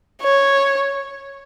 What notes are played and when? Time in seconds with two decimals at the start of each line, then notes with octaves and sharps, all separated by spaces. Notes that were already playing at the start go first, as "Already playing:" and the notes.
0.22 C#5